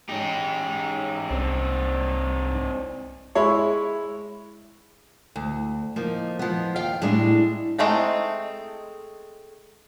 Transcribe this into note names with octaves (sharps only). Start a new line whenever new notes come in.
G#2 C#4 D#4 G4
C2 C4 D4
G#3 E4 C#5
D2
F3 A#3 D#4
F3 B3
D#2 F5 G5
A2 G3 G#3 D4
G#3 A3 C4 D#4